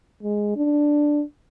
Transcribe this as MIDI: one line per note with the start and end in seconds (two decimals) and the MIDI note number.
0.23 0.54 56
0.56 1.23 62